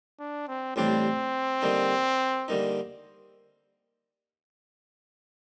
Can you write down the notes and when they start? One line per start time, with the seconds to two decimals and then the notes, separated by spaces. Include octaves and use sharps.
0.20 D4
0.48 C4
0.76 A1 A2 G3 C4 D4 G4
1.62 D3 G3 A#3 D#4
2.48 D3 G3 A#3 D#4